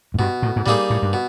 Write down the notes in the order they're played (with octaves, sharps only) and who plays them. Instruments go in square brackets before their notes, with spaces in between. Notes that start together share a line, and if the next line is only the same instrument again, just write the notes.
[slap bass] G#2
[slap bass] G2 [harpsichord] B2
[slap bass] A2
G#2
[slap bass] A2 [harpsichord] G3 A#3 D#4 G#4
[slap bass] A2
G2
[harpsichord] B2